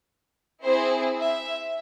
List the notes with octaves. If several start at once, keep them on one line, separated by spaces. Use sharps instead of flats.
C4 E4 G#4 C5
E5